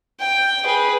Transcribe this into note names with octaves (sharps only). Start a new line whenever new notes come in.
G5
G#4 B4